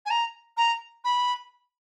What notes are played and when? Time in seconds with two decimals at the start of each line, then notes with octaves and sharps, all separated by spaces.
0.06 G#5
0.10 A#5
0.57 A#5
1.04 B5